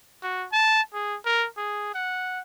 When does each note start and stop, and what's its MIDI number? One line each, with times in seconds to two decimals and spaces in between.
0.23 0.47 66
0.52 0.81 81
0.93 1.17 68
1.26 1.47 70
1.58 1.93 68
1.95 2.40 78